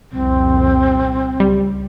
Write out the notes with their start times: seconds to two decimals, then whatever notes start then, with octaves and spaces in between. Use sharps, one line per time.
0.12 C2 F2 A#2 C4
1.40 C#2 G3